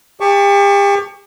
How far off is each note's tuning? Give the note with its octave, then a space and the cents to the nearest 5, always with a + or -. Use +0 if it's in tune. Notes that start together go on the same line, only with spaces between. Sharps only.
G4 +40 A5 +0 C#6 +20